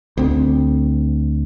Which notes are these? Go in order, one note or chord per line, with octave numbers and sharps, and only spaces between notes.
D2 C4